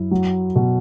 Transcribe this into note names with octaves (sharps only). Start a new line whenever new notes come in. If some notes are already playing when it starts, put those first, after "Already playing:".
Already playing: F#2 E4
F#3
B2